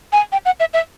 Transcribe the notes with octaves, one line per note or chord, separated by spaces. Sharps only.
G#5
G5
F#5
E5
E5